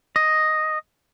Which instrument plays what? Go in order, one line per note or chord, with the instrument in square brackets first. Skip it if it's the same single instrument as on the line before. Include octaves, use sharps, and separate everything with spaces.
[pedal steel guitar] D#5